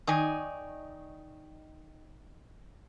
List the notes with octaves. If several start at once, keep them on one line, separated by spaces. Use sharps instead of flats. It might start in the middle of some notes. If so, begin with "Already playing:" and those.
D#3 D#4 D5 G#5